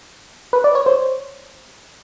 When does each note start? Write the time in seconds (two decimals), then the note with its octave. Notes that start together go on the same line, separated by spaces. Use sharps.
0.53 B4
0.64 D5
0.75 C#5
0.86 C5